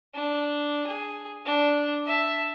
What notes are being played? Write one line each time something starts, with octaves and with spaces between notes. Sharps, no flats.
D4
G#4
D4
E5 A5